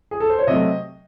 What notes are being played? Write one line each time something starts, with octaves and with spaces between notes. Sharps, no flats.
G#4
A4
C5
C#5
C3 F#3 A3 D#5